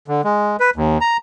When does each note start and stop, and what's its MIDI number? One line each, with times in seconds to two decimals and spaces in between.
0.08 0.21 50
0.24 0.56 56
0.60 0.70 71
0.76 0.98 39
1.01 1.17 82